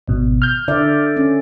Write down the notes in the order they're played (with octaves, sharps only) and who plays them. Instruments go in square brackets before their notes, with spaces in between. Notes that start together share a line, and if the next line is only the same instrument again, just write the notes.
[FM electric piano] G#1 B2
F6 G6
[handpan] D3 D5 E5
C#4